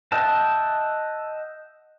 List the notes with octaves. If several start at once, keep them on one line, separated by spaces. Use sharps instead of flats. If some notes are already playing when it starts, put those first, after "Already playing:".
D#5 E5 F#5 G5 A5